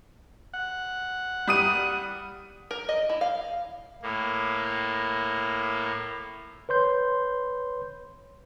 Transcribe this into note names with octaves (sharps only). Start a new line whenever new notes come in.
F#5
G3 D#6 D#7
A#4
D#5
E4
F5
A2 A#3
B4 C#5 C6 G6